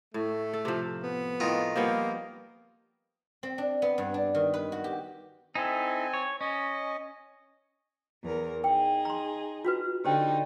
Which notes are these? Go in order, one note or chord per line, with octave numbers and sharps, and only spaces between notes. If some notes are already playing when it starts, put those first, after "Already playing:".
A2 A3
A4
C3 F3
B3
A2 D#3 F4
F3 G3 A#3 B3
C4
D4
B3
G2
D4
D#3
B4
F#4
G4
C4 D#4 E4 A4 G#5
C#5
C#4 D#5
E2 A#4
D#4 G#4 G5
A#5 C6
F4 F#4 B4
D3 D#4 G4 C5 G5